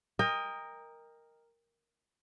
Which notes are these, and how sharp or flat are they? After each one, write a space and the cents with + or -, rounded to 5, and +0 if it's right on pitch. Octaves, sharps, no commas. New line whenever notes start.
A#4 +0 D#5 +0 G5 +30